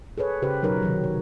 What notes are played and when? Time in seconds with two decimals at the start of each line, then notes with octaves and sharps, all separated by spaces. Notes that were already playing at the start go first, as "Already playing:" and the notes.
0.18 G#4 A4 B4 C#5
0.42 C#3 G4 B4 C5
0.62 B2 F#3 D#4 A#4 B4 C#5
0.83 C3 D#3 F#3
1.04 C#5